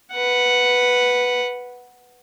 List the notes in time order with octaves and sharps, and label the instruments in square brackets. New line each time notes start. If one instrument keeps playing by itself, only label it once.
[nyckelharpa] B4 F#5